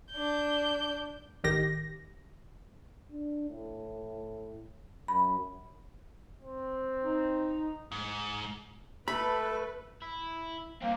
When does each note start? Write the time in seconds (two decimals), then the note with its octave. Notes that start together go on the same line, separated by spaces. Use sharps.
0.12 D4 G6
1.44 A1 D#3 G4 A#6
3.11 D4
3.49 A2
5.08 F#2 B5
6.41 C4
7.04 D#4
7.92 G#2
9.08 A3 A4 B4 B5
10.02 E4
10.82 G2 A#3 C4